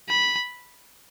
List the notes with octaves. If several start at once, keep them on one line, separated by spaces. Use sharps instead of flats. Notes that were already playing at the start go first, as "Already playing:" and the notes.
B5